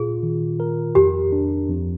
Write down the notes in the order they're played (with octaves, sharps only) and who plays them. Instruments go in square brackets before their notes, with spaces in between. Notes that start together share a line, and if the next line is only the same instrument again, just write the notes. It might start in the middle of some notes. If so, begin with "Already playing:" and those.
Already playing: [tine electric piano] A#2 F4 [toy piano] G#4
[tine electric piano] D#3
A#4
[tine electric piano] F2 [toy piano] G4
[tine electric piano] D4
F2